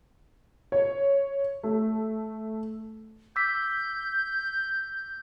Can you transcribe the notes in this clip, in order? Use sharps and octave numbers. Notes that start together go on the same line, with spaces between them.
C#5
A3
D6 E6 G6 B6